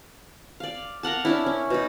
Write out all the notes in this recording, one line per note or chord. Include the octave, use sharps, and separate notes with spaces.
D5 F5
A#4 F5 F#5 A5
C#4 D4 E4
C#4
B2 D#4